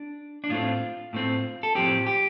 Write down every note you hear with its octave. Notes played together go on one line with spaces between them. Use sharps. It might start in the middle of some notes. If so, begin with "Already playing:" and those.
Already playing: D4
D4
A2 A3 C4 F4
A2 A3 C4
A4
A2 F3 C4 G4
G4